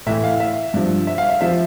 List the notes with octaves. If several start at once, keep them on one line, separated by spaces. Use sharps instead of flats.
A2 E3 E5
F5
E5
G2 F3
E5
F5
E5
F3 E5